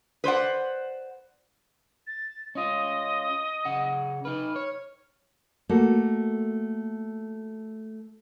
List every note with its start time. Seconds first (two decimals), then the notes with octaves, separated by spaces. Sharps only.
0.24 B4 C5 D5 F#5
2.07 A6
2.55 C#4 F4 D#5
3.65 C#3 F#5
4.25 D#4 B4 F6
4.56 C#5
5.69 A3 A#3 F#4